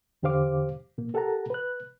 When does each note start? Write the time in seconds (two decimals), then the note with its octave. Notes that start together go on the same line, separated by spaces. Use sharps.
0.23 E2 D3 G4 C5 F5 D6
0.98 A#2 A#3
1.14 G4 A4 A#4 F#5 A5 A#5
1.50 B4 F#6